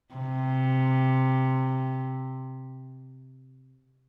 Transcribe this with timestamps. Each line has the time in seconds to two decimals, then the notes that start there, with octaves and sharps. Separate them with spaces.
0.15 C3